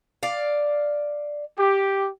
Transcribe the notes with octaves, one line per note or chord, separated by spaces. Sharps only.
D5 F5
G4